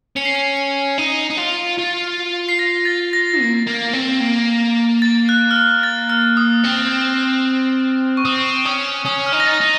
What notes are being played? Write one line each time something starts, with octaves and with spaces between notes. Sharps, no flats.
C#4 C#7
C7
C#7
C#7
D#4
D#4
F4
F4
C7
A#6
A6
A#6
A#3
A#3
C4
A#3
A6
F#6
F6
F#6
A6
F6
D#6
C4
C#6
C4 D#6
C#4 D#6
C#4 D#6
F6
D#4
A#6
A6
D#4